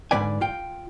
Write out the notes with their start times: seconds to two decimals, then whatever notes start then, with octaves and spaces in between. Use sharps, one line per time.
0.11 G#2 D3 F3 B4 D5 G#5
0.41 F4 G5